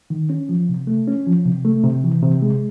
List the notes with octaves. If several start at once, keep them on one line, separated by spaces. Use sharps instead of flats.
D#3
C#4
F3
C3
A3
C#4
F3
C3
A3
C3
E3
C3
G#3